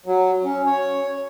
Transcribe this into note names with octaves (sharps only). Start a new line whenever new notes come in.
F#3
C#4
C#5